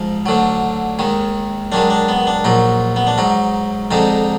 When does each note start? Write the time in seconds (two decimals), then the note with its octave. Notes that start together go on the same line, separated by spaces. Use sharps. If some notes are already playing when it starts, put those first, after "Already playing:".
Already playing: G#2 F3 G#3
0.26 D2 D3 F#3
0.99 D#2 D#3 G#3
1.72 F#2 D#3 G#3 D4
1.90 D4
2.09 B3
2.27 D4
2.44 A#1 A#2 F#3 D#4
2.96 B3
3.07 D4
3.18 G#2 F#3 D#4
3.91 F2 D3 G#3 D#4